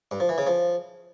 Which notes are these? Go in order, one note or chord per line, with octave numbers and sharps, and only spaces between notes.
G2
F3
E3
C#3
F3